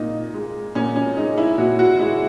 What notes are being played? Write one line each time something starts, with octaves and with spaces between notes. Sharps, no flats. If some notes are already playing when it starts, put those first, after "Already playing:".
Already playing: A#2 D#4
G#3
A#2 C#4
C#4
G#3 D#4
E4
A#2 F#4
F#4
G#3 E4